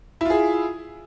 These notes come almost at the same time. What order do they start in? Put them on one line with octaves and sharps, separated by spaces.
E4 F4 G#4